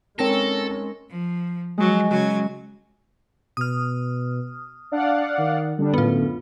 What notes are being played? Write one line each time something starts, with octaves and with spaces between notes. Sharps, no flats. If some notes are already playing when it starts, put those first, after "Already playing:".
G#3 C4 C#4 D#4 A4 A#4 C#5 A#6
F3
F3 F#3 G#3
C#3 F#3 G#5
B2 D#6 F6
D4 D5 F5 F#5
D#3
D3 G3 D4
F#2 A2 B3 F4